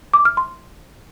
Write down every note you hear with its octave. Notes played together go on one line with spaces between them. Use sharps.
D6
F6
C6